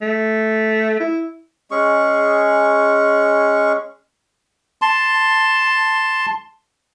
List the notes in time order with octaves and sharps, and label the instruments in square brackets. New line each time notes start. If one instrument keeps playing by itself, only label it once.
[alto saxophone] A3
E4
[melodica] G#3 C#4 G#4 C#6
A5 C6